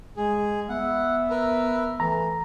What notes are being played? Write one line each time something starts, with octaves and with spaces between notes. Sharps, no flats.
G#3 G#4
B3 E5 F#5
A#4 B4
E3 A3 A#5